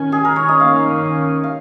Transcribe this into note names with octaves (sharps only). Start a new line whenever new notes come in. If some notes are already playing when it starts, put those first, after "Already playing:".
Already playing: D#3 C#4 G#5
G#4
A#4
C#5
D#5
D#3 A#3 C#4 F5
F5